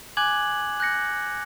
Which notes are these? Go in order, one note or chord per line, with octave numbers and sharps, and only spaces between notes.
G#5 D6 F#6 G#6 F#7
F#6 G6 A#6 C#7